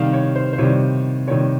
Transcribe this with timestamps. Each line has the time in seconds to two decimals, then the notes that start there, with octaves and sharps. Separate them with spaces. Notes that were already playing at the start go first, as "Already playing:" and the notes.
Already playing: C3 D#3 G3 F5
0.13 C#5
0.36 C5
0.53 C5
0.58 C3 D#3 G3 C#5
1.27 C3 D#3 G3 C#5